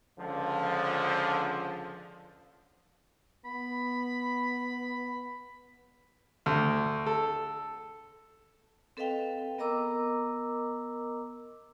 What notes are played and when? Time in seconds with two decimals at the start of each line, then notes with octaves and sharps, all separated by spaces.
0.19 C#2 D3 F3
3.45 B3 B5
6.46 D2
7.06 A4
8.97 C4 A4 B4 D#5 F5 G5
9.58 B3 A#4 D#5 A#5 D6 E6